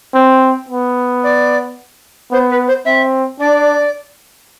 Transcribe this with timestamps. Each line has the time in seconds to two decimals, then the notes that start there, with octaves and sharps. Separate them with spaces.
0.15 C4
0.69 B3
1.23 D5
2.31 B3 C5
2.50 B4
2.67 C5
2.85 C4 E5
3.40 D4 D5